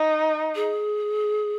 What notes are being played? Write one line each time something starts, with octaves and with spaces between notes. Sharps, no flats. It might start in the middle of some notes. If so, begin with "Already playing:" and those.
Already playing: D#4
G#4